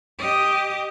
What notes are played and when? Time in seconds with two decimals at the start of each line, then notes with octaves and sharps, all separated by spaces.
0.18 G4 D#5